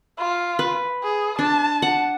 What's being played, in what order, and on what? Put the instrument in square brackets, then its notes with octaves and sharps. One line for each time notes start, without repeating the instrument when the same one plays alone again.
[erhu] F4
[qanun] B4
[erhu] G#4
[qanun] D4 [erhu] A5
[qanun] F#5